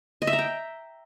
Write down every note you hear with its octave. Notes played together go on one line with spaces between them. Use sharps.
D#5
E5
A#5
G5